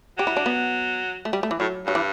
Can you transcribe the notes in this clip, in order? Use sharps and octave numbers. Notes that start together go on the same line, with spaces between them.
F#3 G4
E4
D4
B3
A3
G3
A3
E3
A2 F#3
G2 F#3
E3